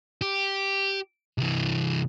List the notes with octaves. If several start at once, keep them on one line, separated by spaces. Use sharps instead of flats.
G4
C2 E3